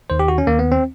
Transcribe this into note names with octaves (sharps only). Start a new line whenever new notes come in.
D#2 D#3 C5
G4
F#4
C#4
D#2 D#3 A#3
B3
C4